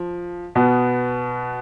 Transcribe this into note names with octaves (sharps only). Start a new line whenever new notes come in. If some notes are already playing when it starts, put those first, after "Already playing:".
Already playing: F3
B2 B3